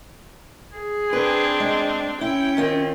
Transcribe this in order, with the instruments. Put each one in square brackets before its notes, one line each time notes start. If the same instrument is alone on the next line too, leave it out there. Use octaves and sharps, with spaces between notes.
[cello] G#4
[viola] C4 D4 [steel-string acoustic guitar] B4
[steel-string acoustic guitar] G#3
[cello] C#4 [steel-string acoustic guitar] E4 [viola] G5
[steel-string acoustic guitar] D#3 C4 F4